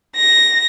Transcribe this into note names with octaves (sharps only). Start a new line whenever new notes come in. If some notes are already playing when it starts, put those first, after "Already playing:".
A#6